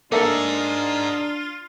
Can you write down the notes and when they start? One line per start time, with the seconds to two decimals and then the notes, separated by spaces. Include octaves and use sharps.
0.12 A#3 D4 D#4 F4 G#4 A4 E5